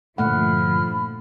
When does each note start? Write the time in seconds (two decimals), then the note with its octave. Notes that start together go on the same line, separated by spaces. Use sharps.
0.18 G2 A#2 D3 F3 A3 F#5 B5 F6